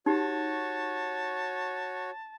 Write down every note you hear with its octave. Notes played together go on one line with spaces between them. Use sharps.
D#4 F#4 G4 C#5 A5